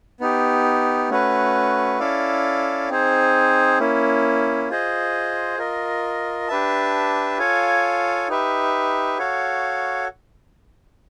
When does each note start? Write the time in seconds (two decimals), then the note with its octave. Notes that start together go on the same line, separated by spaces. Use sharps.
0.20 B3 D#4 G4
1.09 A3 C#4 F#4 B4
2.00 C#4 E4 A4 D5 F5
2.89 C4 D#4 G#4 C5
3.79 A#3 C#4 E4
4.69 F4 G#4 C5 D#5
5.58 F4 A#4 D#5
6.48 D4 G4 B4 E5 A5
7.38 F4 A4 C#5 F5 G#5
8.28 D#4 G4 B4 E5
9.19 F#4 A4 C#5 F5